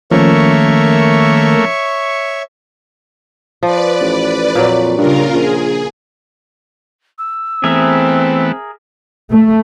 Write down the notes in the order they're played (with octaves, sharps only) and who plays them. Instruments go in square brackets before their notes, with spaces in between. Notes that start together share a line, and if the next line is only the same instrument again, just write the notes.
[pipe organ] D#3 [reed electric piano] F3 C#4 [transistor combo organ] A3 A#3 [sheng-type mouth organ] C#5 E5 C#6
[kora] F3 [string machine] B4 D5
[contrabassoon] A1
[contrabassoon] F2 [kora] A#2 F#3
[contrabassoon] G2 [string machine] C#3 F4 A#4
[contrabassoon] A#1 [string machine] G#4
[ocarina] E6
[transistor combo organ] E3 A3 B3 [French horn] C4 [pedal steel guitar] G#4 A#4 E5
[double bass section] A3